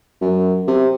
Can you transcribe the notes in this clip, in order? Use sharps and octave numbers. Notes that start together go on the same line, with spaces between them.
F#2
C3